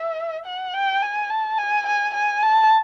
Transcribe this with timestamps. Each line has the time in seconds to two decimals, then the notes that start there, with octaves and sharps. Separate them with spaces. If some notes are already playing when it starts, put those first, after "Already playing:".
Already playing: E5
0.46 F#5
0.74 G5
1.02 G#5
1.30 A5
1.58 G#5
1.86 G#5
2.14 G#5
2.43 A5